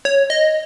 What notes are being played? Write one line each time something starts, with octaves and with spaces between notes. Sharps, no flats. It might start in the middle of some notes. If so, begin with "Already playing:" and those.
C#5
D#5